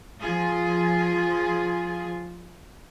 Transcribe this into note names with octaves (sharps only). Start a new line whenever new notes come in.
F3 F4 G#4